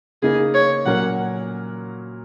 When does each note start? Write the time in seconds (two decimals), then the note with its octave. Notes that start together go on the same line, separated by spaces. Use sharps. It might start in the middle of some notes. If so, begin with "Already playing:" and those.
0.22 C#3 A#3 D#4 G#4
0.54 C#5
0.85 A#2 F#3 C#4 A#4 F#5